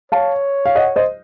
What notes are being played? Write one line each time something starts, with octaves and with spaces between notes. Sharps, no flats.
C#5 F5 A5
F5
D#5 F#5
C5 D#5